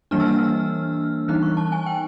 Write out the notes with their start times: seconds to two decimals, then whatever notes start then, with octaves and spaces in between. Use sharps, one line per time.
0.11 E3 G3 A#3 D4 F6
0.20 E6
0.28 F6
1.28 E3 G3 B3 D#4 F#6
1.43 C#6
1.57 A5
1.72 G#5
1.86 G5